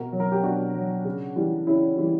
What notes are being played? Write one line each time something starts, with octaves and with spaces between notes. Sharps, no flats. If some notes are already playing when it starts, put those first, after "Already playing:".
Already playing: B2 F#4 A#4
F#3
A#4
G4
B2 D4 F#4
F#3
C#3
E3 G3
C#3 C#4 E4
E3 G3